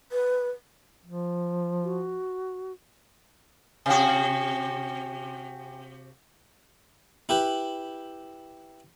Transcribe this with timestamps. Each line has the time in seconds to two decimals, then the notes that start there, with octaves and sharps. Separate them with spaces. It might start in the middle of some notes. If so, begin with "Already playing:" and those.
0.12 B4
1.05 F3
1.83 F#4
3.86 C3 F#4 G5 G#5
7.29 E4 G4 B4